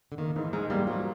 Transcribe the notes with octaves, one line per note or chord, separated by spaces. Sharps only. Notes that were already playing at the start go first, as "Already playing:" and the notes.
D3
D#3 A#3
G#2 E3
G#2 G#3
G3 A#3
F3 F#3